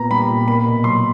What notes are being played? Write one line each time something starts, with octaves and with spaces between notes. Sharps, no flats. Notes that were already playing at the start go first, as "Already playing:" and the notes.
Already playing: A#2 B3 A#5
G3 B5
A#2
A#3 B5
B2
F#3 C6